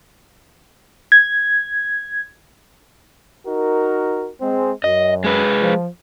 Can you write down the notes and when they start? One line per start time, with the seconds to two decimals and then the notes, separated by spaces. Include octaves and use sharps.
1.12 G#6
3.47 D#4 F#4 A#4
4.41 G#3 C4
4.84 F#2 D#5
5.24 G#3 B4
5.61 F3